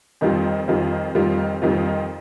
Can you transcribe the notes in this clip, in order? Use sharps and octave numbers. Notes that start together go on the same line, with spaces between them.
F2 D#3 G3 C4 F4
F2 D#3 G3 C4 F4
F2 D#3 G3 C4 F4
F2 D#3 G3 C4 F4